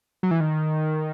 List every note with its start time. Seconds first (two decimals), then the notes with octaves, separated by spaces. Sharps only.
0.23 F#3
0.31 E3
0.40 D#3